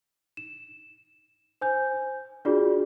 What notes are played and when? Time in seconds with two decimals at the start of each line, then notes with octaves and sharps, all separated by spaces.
0.37 E7
1.61 C5 G#5 G6
2.45 D4 F4 F#4 G#4 D5